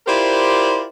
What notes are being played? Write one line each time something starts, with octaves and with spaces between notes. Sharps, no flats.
E4 F4 G4 A#4 C5 D5